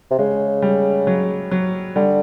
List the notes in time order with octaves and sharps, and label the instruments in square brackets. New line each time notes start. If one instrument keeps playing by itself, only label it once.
[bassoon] C3
[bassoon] C#3 [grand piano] G#3
[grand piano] G3
F#3
F#3
[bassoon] D3 [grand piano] G3